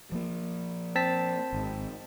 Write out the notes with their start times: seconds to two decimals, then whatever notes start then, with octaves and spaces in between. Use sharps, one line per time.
0.12 F3 A#3
0.95 C4 A5 B6
1.53 G#1 G#2